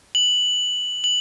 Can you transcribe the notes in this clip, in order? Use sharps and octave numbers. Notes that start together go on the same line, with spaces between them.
F#7
F#7